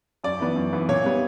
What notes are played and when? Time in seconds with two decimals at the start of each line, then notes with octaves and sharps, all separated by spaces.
0.24 F#2 D5
0.40 E3 B3
0.56 F#2
0.73 E3 B3
0.89 A#2 C#5
1.05 G3 B3